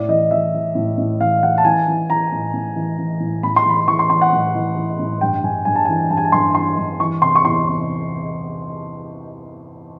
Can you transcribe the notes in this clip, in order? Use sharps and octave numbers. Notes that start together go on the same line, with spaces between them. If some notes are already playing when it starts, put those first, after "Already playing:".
Already playing: A2 D5
E3 D#5
E3 E5
E3
A2
A2
E3 F5
E3 F#5
A5
E3 G#5
E3
E3 A#5
A2
A2
E3
E3
A2
A2 B5
C6
E3 B5
E3 C#6
C6
E3 C6
F#5
A2
E3
E3
A2
G2 G5
G2 G#5
G2 G#5
A5
E3 G#5
G2 A5
G#5
A5
G2 C6
E3 C6
G2
E3 C#6
C3 C6
C#6
E2 C6
C3